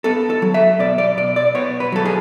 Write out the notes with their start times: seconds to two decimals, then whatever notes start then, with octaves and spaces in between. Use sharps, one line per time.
0.04 B3 A4
0.30 A4
0.42 F#3
0.54 E5
0.79 B2 D5
0.98 D5
1.17 B2 D5
1.36 D5
1.55 B3 C#5
1.80 B4
1.92 F#3 A4
2.05 G#4